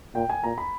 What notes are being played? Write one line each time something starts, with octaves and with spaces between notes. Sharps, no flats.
A#2 G5
G#5
A#2 A#5
B5